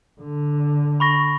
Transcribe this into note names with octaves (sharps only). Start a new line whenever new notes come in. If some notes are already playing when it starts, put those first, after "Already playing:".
D3
B5 C#6 A#6